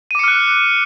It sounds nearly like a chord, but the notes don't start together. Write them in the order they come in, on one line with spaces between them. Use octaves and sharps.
D#7 D6 C#7 F6 F#6